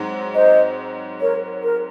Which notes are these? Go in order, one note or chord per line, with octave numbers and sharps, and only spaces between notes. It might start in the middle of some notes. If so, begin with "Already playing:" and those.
Already playing: G#2 F#3 C4
C5 D#5
A#4 C#5
A#4